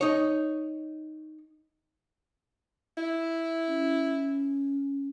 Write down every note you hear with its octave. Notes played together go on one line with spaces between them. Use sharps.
D#4 C#5
E4
C#4